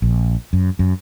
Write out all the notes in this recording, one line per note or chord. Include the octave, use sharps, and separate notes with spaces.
A#1
F#2
F#2